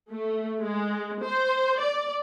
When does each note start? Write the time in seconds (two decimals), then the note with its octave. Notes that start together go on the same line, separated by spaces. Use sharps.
0.11 A3
0.61 G#3
1.23 C5
1.78 D5